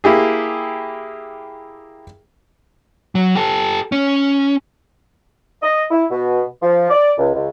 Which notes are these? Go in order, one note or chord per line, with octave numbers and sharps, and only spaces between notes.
A#3 E4 G4 G#4
F#3
G4 A4
C#4
D#5
E4
B2
F3
D5
C#2
C#2